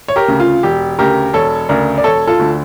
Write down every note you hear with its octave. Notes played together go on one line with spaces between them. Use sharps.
C#5
G4 A#4
D2 C#3
F4
E1 G4
D2 C#3 G4 A#4
E1 A4 C#5
D2 C#3 A#4 D5
D5
E1 A4 C#5
F4 A4
D2 D3